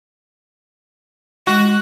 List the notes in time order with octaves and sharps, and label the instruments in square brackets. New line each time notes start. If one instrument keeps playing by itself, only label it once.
[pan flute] G#3 [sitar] F#4